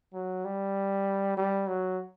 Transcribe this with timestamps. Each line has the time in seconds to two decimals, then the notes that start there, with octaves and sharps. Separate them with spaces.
0.14 F#3
0.45 G3
1.37 G3
1.68 F#3